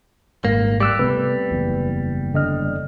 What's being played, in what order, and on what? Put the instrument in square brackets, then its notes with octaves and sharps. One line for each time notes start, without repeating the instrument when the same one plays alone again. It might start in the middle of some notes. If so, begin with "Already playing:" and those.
[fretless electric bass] D#1 G#1 G#2 [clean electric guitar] A#3
[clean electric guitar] G3 [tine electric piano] D6 E6 F#6
[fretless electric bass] C3 A3 B3 [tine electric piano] B4
[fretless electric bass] F#1 E2
[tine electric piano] D3 D#5 F6